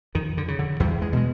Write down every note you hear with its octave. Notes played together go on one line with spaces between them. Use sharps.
F2 D#3
D3
C#3
D3
E2 G3
G#3
B2 G#3